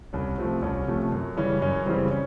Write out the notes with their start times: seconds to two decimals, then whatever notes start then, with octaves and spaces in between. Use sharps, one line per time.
0.13 C2 C#4
0.38 C3 F3 A3 C4
0.62 C2 C#4
0.87 C3 F3 A3
1.12 F#2
1.37 C#3 E3 G3 C#4
1.62 F#2 C#4
1.86 C#3 E3 G3 C4
2.11 C#4